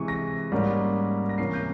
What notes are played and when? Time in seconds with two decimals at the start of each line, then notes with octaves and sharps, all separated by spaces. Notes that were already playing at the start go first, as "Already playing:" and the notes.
Already playing: C3 E3 G#3 C#6
0.08 A#6
0.52 G#2 G3 A#3 C#4
1.29 A#6
1.38 C3 E3 A#3 C#4 C7
1.53 G6